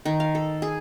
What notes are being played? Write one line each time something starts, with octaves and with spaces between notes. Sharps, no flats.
D#3
F5
A4
G#4